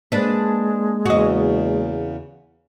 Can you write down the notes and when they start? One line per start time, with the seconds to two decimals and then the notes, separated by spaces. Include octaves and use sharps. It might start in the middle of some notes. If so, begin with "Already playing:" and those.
0.12 G#3 A#3 D4 B4
1.06 E2 C#3 F#4 D#5